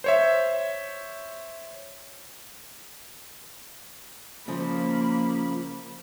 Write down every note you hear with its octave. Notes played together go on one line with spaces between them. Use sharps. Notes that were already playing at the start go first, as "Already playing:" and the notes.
C5 C#5 E5
C#3 F3 A#3 B5